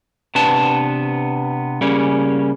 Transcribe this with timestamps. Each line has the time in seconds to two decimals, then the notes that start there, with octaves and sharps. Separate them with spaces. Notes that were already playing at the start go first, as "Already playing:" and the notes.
0.35 C3 B3 D4 B4 A5
1.81 C#3 G3 A#3 C#4